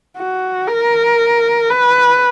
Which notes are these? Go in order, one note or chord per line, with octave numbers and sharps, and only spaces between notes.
F#4
A#4
B4